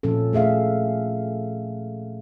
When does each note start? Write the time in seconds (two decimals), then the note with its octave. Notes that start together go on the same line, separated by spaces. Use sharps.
0.03 A#2 F3 C#4 A4
0.33 A3 G#4 E5 F5